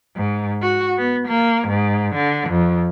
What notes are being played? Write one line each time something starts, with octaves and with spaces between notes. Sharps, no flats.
G#2
F#4
B3
A#3
G#2
D3
F2